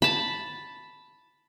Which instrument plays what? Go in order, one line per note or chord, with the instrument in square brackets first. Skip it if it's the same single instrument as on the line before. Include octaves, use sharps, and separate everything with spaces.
[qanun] A5 B5